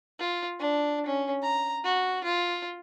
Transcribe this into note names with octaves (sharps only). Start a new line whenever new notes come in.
F4
D4
C#4
A#5
F#4
F4